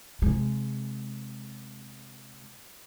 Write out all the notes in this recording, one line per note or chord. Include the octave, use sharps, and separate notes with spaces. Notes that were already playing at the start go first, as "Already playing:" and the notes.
C3 G#3